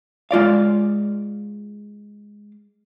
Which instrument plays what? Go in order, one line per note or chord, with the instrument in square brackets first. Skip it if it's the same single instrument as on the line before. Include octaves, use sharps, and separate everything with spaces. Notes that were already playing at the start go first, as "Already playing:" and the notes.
[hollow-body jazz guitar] G#3 F4 D5 F5